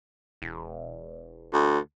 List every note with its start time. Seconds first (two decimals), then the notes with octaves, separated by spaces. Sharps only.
0.42 E1
1.53 D2